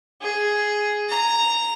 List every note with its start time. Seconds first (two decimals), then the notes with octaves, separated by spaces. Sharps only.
0.22 G#4
1.09 A#5